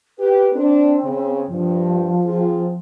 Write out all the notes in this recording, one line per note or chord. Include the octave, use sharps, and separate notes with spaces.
G4 B4
C4 D4
C#3
G2 F3
C4 F4 G#4